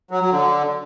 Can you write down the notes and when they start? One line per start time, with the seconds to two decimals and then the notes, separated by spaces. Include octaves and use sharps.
0.11 F#3
0.21 F#3
0.31 D3